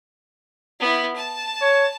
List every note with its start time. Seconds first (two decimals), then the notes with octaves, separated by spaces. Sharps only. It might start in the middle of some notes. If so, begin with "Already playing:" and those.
0.80 B3 E4
1.15 A5
1.62 C#5